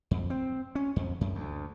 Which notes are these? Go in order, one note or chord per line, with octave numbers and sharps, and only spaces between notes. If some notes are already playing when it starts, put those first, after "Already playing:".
F2
C4
C#4
F2
F#2
D2